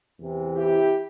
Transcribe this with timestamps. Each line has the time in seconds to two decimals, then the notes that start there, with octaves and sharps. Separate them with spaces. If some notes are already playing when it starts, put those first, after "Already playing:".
0.18 E2 C3 E3
0.55 E4 G4